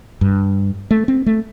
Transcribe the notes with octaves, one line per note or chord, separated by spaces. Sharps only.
G2
A3
C4
A3